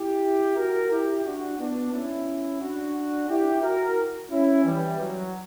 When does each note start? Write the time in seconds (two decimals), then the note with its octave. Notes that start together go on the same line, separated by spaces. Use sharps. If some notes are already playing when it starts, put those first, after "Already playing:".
Already playing: E4 G4
0.57 F#4 A#4
0.90 E4 G4
1.25 D4 F#4
1.58 B3 D4
1.92 C#4 E4
2.60 D4 F#4
3.29 E4 G4
3.63 F#4 A#4
4.31 C#4 E4
4.64 E3 G3
4.99 F#3